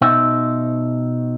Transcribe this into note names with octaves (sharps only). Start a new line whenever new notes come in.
B2 D#4 C5 E5